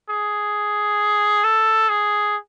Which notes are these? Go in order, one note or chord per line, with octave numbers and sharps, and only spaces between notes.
G#4
A4
G#4